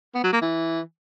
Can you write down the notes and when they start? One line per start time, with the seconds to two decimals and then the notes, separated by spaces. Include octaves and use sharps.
0.15 B3
0.24 F#3
0.33 A#3
0.42 E3